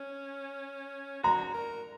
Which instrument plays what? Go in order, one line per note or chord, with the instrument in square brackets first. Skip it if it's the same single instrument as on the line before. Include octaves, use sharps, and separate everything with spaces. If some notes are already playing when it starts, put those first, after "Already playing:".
Already playing: [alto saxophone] C#4
[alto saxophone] F#4 [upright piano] A#5
[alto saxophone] A#4